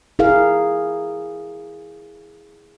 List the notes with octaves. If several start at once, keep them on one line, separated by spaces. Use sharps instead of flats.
E4 G#4 A#4 F5